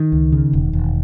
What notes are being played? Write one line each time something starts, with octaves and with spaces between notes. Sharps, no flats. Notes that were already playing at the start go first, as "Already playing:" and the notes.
Already playing: D#3
C#2
C#3
E1
E1